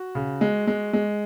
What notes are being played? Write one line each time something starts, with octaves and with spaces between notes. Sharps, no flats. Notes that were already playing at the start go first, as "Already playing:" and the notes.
Already playing: F#4
C#3
G#3
G#3
G#3